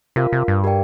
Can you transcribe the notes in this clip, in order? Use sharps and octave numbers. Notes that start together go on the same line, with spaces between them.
C3 F4 A#4 F5
C3
G2
G4 A#4 D5 G5